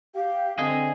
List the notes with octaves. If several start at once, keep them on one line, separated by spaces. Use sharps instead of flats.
G4 F5
D3 C4 G#4 D#5